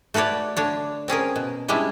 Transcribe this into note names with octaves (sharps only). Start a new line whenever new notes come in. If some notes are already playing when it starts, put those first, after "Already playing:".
A3 F#4 B4 C#5 D5
D3 D4 C#5
C4 C#4 G#4 A#4
B2
G3 G#3 C#4 D4 E4